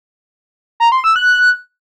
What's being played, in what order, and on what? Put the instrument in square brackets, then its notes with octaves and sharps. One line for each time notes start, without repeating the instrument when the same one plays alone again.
[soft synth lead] A#5
C6
E6
F#6